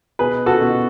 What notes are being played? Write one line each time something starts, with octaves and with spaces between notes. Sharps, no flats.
B2 G#4 B4
F#4 A4
B2